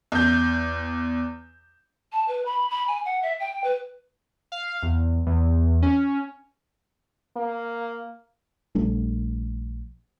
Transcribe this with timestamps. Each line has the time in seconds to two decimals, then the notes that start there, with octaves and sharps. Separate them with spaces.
0.12 E2 G6
2.12 A5
2.28 B4
2.45 B5
2.70 B5
2.88 G#5
3.05 F#5
3.22 E5
3.40 G5
3.64 B4
4.52 F5
4.83 E2
5.26 E2
5.82 C#4
7.36 A#3
8.75 A#1 G3 A3 D4